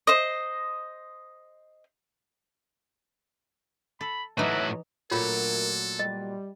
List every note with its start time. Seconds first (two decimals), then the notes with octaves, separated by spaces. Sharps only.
0.07 C5 D#5
4.01 A4 B5
4.38 A2 E3 F#3 D#4 E5 F#6
5.11 D2 A#2 F#3 A3 F4 A4 A#4 C#5
5.99 G3 D#5